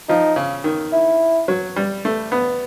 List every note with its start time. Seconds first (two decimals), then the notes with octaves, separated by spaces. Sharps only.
0.09 F3 D#4
0.36 C#3
0.64 D#3
0.93 E4
1.48 F#3
1.76 G3
2.05 A3
2.32 B3